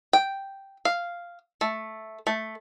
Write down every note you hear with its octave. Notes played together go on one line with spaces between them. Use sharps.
G5
F5
A3
A3